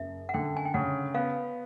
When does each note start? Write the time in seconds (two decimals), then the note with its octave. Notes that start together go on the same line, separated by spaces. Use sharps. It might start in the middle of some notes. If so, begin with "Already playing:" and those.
Already playing: F#1 E5
0.29 F#5
0.34 D3 G5
0.57 G#5
0.65 G5
0.74 C#3 F#5
1.14 B3 F5